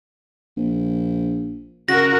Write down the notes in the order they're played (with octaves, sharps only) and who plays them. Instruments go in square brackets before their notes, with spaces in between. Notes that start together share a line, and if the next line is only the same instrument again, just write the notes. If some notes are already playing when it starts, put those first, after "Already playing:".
[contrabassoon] A#1
[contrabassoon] C#3 [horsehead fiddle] F#4 A#4 [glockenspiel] A#6